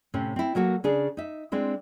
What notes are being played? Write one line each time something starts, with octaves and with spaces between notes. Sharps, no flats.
A2 C3 C4 C#4
C4 E4
F#3 A#3 F#4 A4
C#3 D4 G#4
D#4 E5
G#3 C4 D4 E4